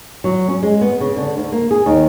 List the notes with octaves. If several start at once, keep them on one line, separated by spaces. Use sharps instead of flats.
F#3
C#4
G#3
B3
C#3
D3
D2
A#3
G#4
D#2